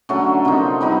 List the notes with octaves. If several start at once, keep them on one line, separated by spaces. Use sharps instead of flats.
D3 F#3 A3 C#4
C3 F3 A#3 D#4
G3 B3 D#4